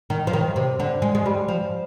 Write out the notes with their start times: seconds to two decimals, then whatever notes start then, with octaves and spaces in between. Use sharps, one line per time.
0.10 D#3
0.27 F3
0.33 D#3
0.56 C3
0.80 D3
1.02 G#3
1.15 G#3
1.26 G3
1.49 F3